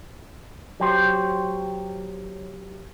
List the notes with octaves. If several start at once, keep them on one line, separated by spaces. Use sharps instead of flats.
F#3 G4 C5